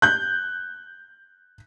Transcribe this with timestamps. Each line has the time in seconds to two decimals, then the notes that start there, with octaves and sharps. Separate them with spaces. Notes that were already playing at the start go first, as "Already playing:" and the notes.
0.02 F#6 G6